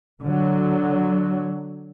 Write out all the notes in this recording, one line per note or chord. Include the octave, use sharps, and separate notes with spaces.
D3 F#3